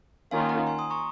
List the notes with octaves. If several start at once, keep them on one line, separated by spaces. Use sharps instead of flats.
D#3 A#3 C#4 F4 F5 G#5
F#5 A#5
G#5 C6
C6 D#6
A#5 C#6